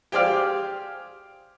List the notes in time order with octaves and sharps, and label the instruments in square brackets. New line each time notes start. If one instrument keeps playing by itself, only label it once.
[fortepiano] G4 G#4 C5 D5 F5